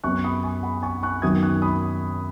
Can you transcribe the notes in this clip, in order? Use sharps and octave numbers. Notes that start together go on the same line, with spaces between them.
F#2 F#3 B3 C#6 F#6
B5 D#6
G#5 C#6
F#5 B5
G#5 C#6
C#6 F#6
F#2 D#3 F#3 B3 D#6 G#6
C#6 F#6
B5 D#6